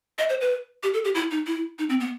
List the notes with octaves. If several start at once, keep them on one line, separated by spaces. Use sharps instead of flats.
D#5
C5
B4
G4
A4
G4
E4
D#4
E4
D#4
C4
B3